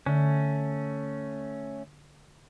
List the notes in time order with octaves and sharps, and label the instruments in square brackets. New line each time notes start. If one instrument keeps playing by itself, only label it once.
[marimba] D3 [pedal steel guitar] A3 C#4